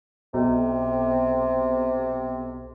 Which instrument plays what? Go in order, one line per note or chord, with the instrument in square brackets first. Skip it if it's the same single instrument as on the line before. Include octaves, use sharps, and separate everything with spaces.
[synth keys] B1 [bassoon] C3